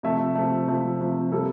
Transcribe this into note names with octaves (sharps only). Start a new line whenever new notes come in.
C3 F3 A3 E5
C3 F3 A3
C3 F3 A3
C3 F3 A3
C3 G3 A#3 A4